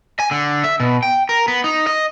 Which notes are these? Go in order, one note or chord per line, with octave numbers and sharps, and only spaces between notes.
G#5
D3
E5
B2
G5
A#4
B3
D#4
D#5